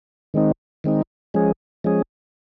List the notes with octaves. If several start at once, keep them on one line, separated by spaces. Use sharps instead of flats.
D#3 G#3 C4 D#4
D#3 G#3 C4 D#4
F3 G#3 C#4 G#4
F3 G#3 C#4 G#4